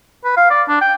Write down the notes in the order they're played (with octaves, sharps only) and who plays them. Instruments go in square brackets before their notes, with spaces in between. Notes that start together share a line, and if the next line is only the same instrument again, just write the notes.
[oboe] B4
F5
D5
D4
G5